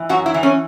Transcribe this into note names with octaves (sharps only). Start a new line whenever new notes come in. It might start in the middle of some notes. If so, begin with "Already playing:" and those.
Already playing: E3
F#2 F#4
E4
E3
C#4